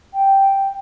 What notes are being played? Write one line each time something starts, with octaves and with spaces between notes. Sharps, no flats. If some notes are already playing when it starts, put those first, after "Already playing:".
G5